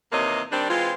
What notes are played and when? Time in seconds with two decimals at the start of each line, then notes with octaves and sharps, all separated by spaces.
0.12 D#2 C3 E3 A#3 C#5 D#5
0.51 D#3 G3 C4 D4
0.69 E3 G#3 C4 F4